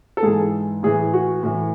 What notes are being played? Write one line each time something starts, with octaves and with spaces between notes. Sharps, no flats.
A4
G#2 E3 G#4
A2 E3 G#4
F#4
A2 E3